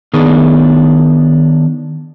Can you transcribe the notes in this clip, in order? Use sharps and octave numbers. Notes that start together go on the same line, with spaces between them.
D#3 B3 D4 D#4 G#4